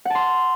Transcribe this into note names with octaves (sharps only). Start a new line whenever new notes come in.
F#5 A5 C6